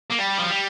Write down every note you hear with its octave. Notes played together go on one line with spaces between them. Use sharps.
A#3
G3
F3
G3